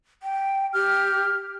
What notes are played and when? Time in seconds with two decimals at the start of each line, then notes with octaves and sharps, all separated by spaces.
0.23 G5
0.73 G4 F6